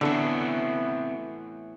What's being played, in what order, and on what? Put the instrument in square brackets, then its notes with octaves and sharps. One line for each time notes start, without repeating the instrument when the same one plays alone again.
[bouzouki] A2 E3 [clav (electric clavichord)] D3 A4 [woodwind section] B3 [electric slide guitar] C4 F#4 E5